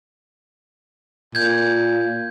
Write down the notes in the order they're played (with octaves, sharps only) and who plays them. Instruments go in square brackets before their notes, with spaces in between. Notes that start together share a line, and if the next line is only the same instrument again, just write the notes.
[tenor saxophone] A#2 [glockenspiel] G6 G#6